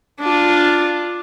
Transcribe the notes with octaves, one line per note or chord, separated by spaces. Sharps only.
D4 F4